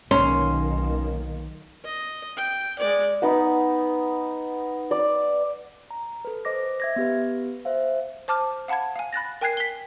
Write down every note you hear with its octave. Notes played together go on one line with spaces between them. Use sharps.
B1 D#3 A#3 C#4 C6
D#5
G5
G#3 D5
B3 D#4 F#5
D5
A#5
A4 B4
C5 D#5 D6 A#6
E5 G#6 A#6
B3 G4 B4
C5 E5 F5
C5 A5 D6 F6
F5 F#5 A5 B5 G#6
F5 G#5
B5 F#6 A6 A#6
A#4 G5 G#5 F#6 G#6 C7
B6 G7